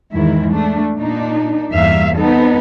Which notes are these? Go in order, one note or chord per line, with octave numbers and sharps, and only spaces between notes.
E2 G#2 D#3 E4
A3 D4
A#2 D4 D#4
E2 G2 A#3 E5 F5
B3 C4 D#4 A4